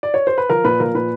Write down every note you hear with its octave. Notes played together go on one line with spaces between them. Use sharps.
D5
C#5
C5
B4
F3 A#4
A#2 B4
F3 A#4
A#2 B4